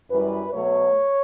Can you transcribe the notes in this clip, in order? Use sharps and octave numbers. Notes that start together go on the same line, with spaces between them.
F#2 E3 G3 B4
B2 F#3 A3 C#5